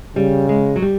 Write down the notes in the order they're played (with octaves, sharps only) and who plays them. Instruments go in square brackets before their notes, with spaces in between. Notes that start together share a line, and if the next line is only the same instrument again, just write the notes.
[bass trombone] C#3 [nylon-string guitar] G3
[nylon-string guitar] G#3
F#3
G3